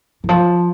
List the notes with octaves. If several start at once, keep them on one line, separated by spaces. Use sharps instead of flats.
E3
F3